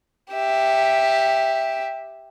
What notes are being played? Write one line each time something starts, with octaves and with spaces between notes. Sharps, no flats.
G4 E5